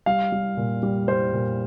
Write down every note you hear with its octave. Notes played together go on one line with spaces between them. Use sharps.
G3 F5
G3
A#2
G3
G3 C5
A#2